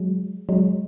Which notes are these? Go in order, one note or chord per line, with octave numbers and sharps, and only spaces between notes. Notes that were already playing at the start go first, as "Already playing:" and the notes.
Already playing: F#3 G#3
F#3 G#3